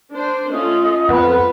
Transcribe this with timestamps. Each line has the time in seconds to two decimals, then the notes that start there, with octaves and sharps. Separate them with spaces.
0.13 D4 C5
0.51 A3 C#4 F4 D#5
1.09 F2 B3 F4 B4 F#5